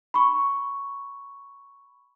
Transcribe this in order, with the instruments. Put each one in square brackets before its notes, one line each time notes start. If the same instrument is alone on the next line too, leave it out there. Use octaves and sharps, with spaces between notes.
[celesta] B5 C#6